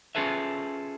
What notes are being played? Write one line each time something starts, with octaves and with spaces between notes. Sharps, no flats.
C#4 F4 G#4 A4 B4 E5